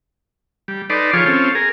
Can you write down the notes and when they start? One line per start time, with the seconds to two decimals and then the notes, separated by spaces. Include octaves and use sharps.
0.68 G3
0.90 D#4 A4 B4 D5 C6
1.13 F3 F4 G#4 C#5
1.26 C4 C#4 F4 A4
1.55 G#4 A#4